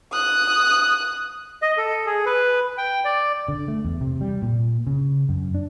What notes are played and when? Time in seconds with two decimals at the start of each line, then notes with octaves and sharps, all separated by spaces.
0.12 D#6 F#6
1.62 D#5
1.77 A4
2.06 G#4
2.26 B4
2.78 G5
3.05 D5
3.48 D3
3.68 A3
3.85 E2
4.01 C3
4.21 G3
4.42 A#2
4.87 C#3
5.29 F#2
5.54 D4